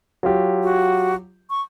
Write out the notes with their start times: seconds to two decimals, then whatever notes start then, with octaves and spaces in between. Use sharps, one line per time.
0.23 F#3 F4 G4
0.63 F#4
1.50 C#6